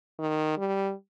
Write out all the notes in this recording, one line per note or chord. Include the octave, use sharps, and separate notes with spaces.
D#3
G3